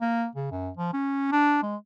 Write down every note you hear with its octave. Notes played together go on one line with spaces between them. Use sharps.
A#3
C#3
F#2
F3
C#4
D4
G#3